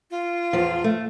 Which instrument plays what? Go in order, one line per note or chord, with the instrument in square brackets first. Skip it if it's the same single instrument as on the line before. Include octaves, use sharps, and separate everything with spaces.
[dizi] F4
[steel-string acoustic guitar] E2 F3
A3